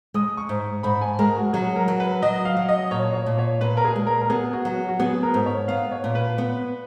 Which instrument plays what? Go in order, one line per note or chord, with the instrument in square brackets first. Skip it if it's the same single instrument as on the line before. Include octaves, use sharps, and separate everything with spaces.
[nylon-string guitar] G#3 [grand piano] D#6
[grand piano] C#6
[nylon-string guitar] G#2
[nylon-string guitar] G#2 [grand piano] B5
[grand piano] G#5
[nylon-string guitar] G#3 [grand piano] A#4
[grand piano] F#4
[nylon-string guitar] F#3 [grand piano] G#4
[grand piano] A#4
[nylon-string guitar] F#3
[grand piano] B4
[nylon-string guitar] F#3 [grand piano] D#5
[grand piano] F5
[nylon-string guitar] F#3
[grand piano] D#5
[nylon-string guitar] A#2 [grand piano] C#5
[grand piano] C#5
[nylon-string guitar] A#2
[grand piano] C#5
[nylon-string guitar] A#2 [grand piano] B4
[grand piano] A#4
G#4
[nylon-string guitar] G#3
[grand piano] A#4
A#4
[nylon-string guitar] B3 [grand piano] G#4
[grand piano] F#4
[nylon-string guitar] F#3
[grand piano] F#4
F#4
[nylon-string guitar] B3 [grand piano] G#4
[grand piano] A#4
[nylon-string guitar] G#2
[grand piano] C#5
[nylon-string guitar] B3 [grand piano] F5
[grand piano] C#5
[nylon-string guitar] A#2
[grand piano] B4
[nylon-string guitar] B3